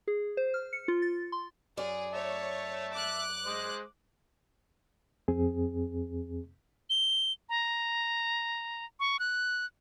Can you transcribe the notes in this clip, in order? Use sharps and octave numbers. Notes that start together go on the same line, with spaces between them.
G#4
C5
F6
C#7
F4
A6
C6
F#2 G#4 D5
C#5 E5 A5
D6 F#6
G#3 C5 D#5
F2 C4 G#4
G7
A#5
C#6
F#6